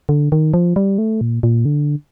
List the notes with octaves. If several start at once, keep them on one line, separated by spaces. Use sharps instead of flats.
D3
D#3
F3
G3
A3
A#2
A#2
D3